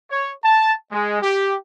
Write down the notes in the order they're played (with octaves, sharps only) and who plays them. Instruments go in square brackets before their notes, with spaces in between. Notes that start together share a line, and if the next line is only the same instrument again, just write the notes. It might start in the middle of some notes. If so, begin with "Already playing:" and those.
[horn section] C#5
A5
G#3
G4